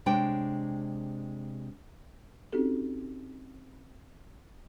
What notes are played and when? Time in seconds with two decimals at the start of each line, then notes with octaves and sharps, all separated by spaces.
0.06 C3 G#3 D4 C#5 G5
2.53 C4 C#4 D#4 F#4 G4 A4